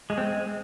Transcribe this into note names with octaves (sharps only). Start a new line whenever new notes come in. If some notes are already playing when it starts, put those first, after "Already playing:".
G#3
C4
G#3